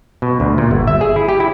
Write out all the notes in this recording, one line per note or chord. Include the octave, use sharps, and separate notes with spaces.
B2
D2
A#2
G1
E5
G#4
E4
G4
E4